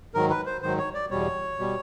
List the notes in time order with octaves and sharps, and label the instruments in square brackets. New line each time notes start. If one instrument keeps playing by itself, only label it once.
[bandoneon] G#2 D#3 F#3 A#4
B4
C5
G#2 D#3 F#3 C5
C#5
D5
E2 B2 G3 C#5
B2 G3